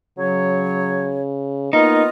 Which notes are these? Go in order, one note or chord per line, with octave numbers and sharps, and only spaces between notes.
C#3 F#3 C#5
A#3 B3 D#4 F4 D#5